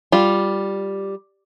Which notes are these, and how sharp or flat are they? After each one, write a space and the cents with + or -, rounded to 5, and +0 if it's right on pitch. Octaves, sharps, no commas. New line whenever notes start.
G3 +0 F4 +0